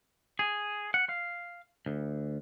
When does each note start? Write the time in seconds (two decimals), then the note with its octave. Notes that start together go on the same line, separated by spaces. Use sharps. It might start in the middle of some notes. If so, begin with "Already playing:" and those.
0.39 G#4
0.94 F#5
1.09 F5
1.86 D2